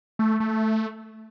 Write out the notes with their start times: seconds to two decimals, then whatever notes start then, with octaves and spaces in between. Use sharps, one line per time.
0.19 A3
0.40 A3